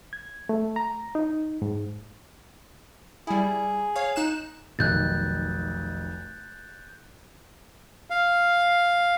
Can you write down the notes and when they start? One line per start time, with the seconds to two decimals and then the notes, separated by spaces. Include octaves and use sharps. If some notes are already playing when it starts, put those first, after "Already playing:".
0.13 G#6
0.49 A3
0.76 A#5
1.15 D#4
1.62 G#2
3.27 G3 E4 G#4
3.96 C#5 F5
4.16 D#4 F#6 E7
4.79 F1 B1 D#3 F#6 G6 A6
8.10 F5